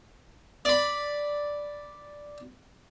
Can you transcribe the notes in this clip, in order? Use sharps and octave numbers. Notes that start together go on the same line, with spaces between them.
D5 B5